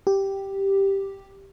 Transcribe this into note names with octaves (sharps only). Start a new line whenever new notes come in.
G4